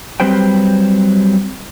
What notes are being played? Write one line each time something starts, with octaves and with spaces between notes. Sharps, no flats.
F#3 G3 C4 B4 C5 G5